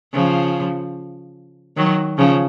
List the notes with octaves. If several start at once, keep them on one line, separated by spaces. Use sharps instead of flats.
C#3 F3
D#3 F#3
C#3 F3